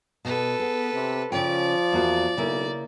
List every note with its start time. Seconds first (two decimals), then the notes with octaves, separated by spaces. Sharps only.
0.25 B2 A4 B4
0.60 B3 G#4
0.94 C3
1.32 C#3 F3 C#4 D5 G5
1.92 E2 A#3 F#4
2.37 B1 C#3 A#3 E4